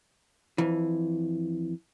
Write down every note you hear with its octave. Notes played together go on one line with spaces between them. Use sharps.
F2 E3